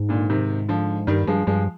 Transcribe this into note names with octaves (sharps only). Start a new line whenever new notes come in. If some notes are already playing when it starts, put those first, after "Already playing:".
Already playing: G#2
A#2 D3
C3 D#3
D3 F3
G2 D#3 G3
G2 F3 G#3
G2 F3 G#3